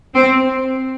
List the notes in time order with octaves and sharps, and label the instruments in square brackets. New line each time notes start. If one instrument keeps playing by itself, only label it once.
[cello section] C4